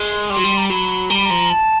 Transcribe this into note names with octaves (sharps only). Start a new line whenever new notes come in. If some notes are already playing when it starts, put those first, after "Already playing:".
Already playing: G#3
G3 C6
F#3
G3
A#5
F#3 B5
G3 A#5
B5
F3 A#5
A5